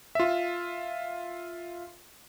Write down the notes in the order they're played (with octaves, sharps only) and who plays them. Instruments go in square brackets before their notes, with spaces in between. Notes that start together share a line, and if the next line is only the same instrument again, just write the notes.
[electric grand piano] F4 E5